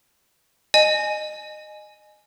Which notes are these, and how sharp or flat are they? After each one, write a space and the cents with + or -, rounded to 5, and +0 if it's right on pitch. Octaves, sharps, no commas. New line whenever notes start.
D#5 -20 G#5 +10